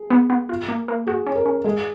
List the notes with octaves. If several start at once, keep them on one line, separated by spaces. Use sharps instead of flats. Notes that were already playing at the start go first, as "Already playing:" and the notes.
Already playing: G#4
B3
B3
F4
A#3
A#3
F#4 G#4
C#4
A#4
C#4
G#3 G#4